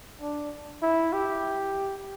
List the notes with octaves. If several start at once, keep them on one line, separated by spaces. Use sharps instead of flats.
D4
E4
G4